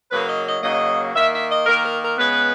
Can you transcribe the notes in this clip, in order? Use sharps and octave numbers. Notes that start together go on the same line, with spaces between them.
C#3 F#3 A#3 B4
D#5
D#5
C#3 F#3 A#3 D#5
D#3 A#3 E5
E5
D#5
D#3 A#3 A#4
A#4
A#4
C#3 G#3 B3 B4